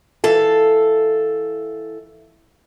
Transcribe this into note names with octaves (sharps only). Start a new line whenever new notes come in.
E3 A4 F5